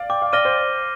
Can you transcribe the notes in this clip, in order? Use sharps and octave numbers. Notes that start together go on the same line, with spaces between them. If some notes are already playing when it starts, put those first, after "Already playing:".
Already playing: D5 F5
G5 D6
F5
D5 F6 A#6 D#7 G7
C5